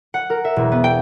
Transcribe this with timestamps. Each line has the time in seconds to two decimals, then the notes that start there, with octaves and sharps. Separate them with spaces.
0.14 F#5
0.30 A#4
0.45 E5
0.56 E1
0.72 B3
0.84 G5